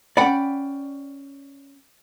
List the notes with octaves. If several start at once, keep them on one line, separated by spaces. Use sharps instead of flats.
C#4 D5 F#5 G5 B5